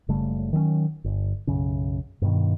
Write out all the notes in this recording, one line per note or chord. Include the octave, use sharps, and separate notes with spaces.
F#1 C#3 G3 A3
D#3 F#3 G#3 C#4
G1
B1 F#2 C#3
G2 B2 D#3